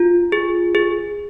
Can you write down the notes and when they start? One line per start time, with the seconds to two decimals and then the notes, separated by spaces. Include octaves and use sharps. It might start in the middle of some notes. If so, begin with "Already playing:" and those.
Already playing: F4
0.32 G#4
0.75 G#4